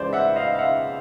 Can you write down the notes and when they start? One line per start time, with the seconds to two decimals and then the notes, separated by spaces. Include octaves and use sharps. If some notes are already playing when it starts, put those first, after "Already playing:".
Already playing: C#2 C#3 E3 C5 D5
0.13 E5 F#5
0.36 D#5 F5
0.54 F5
0.59 E5 F#5